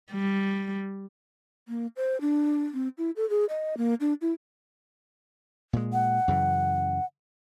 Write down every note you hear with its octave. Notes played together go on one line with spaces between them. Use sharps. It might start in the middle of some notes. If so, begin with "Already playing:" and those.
G3
A#3
C5
D4
C4
E4
A4
G#4
D#5
A#3
D4
E4
A#2 G#3
F#5
F#2 C#3 E3